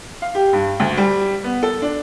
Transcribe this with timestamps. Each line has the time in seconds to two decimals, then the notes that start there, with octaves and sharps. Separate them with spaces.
0.22 F5
0.35 G4
0.53 G2
0.80 D2
0.97 G3
1.44 B3
1.63 A4
1.82 D4